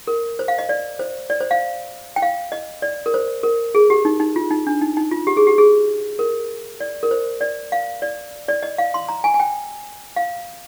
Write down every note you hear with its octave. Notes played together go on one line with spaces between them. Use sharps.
A#4
C5
F5
D#5
D5
C5
D5
C5
F5
G5
F5
D#5
D5
A#4
C5
A#4
G#4
G4
D#4
D#4
F4
D#4
D4
D#4
D#4
F4
G4
G#4
G4
G#4
A#4
D5
A#4
C5
D5
F5
D5
D5
D#5
F5
C6
A#5
G#5
G#5
G5
F5